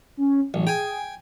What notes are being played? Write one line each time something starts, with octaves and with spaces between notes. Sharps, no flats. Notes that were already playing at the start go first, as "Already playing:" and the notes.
C#4
A1 F#3
G#4 G5 G#5